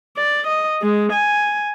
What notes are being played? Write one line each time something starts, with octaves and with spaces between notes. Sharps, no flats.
D5
D#5
G#3
G#5